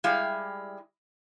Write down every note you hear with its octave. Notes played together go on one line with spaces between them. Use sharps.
G3 G#3 E4 G4 F5